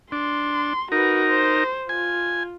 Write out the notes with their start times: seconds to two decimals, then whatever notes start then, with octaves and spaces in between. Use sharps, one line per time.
0.12 D4 C6
0.92 D#4 F#4 A#4 B4
1.28 C5
1.89 F4 G#5